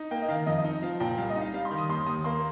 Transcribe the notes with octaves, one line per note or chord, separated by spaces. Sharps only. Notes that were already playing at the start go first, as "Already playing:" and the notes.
Already playing: D#4
A#3 G5
D#5
D#3 F5
F2 D#5
D#5
D#4
D#5
F3 F5
A#2 G5
C2 F5
D#5
D#4
F5
G3 F5
C6
D#3
D#6
D#2 C6
D#2 D#6
A#3 C6